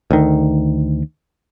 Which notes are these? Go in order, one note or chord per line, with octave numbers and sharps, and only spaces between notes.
D2 D#3